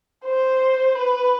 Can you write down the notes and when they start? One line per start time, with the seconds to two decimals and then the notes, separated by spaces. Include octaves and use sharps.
0.25 C5
0.95 B4